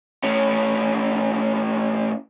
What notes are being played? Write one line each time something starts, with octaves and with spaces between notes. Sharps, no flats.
A2 C#4